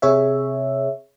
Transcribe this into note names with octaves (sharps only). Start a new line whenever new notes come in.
C3 G#4 C#5 E5